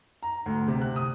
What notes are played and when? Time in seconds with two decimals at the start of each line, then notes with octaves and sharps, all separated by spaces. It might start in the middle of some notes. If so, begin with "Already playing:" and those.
0.23 A#5
0.46 D2
0.68 C3
0.82 F#6
0.96 D#6